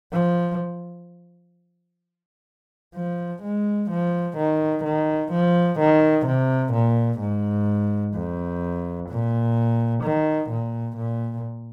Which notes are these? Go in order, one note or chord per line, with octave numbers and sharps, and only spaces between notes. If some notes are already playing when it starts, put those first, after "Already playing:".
F3
F3
G#3
F3
D#3
D#3
F3
D#3
C3
A#2
G#2
F2
A#2
D#3
A#2
A#2